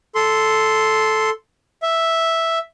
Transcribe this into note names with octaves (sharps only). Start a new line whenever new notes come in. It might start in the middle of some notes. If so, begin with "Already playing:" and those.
A4 C6
E5